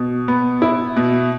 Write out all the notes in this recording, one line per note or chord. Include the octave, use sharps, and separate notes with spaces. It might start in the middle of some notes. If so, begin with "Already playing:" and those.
Already playing: B2
B3
E4
B2